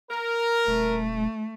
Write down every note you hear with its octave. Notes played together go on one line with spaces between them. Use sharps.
A#4
D#1 A3